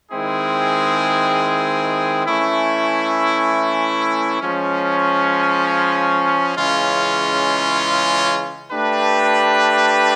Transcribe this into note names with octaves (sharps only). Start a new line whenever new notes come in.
D#3 G#3 C4 E4 G#4
E3 A3 C#4 E4
F3 G#3 C#4
C#3 E3 G#3 C#4 F4
A3 D4 G4 B4